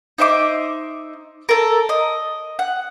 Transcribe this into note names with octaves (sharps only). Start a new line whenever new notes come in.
D#4 C5 E5 D6
A4 A#4
D#5
F#5